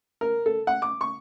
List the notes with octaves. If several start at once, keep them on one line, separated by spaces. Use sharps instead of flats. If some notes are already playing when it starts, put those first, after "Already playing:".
A#4
A4
F#5
D6
C#6